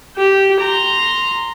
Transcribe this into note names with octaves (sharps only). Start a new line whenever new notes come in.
G4
A#5 C6